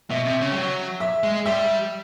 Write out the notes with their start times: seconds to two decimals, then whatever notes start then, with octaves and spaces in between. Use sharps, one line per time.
0.10 B2 E5
0.25 C3
0.41 C#3
0.52 G3
0.55 F#3
1.00 E5
1.23 G#3
1.46 G3 E5